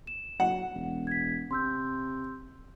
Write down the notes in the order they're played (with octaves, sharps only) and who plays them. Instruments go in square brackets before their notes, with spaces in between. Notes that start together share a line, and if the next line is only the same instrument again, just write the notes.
[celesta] E7
[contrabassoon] F#3 [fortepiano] F#5
[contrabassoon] E1
[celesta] G#6 B6
[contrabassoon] C3 [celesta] C6 E6 G6